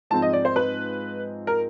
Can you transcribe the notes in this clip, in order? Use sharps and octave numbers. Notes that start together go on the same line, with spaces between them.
G#2 F3 G#3 C4 D#4 A5
D#5
D5
C5
B4
A#4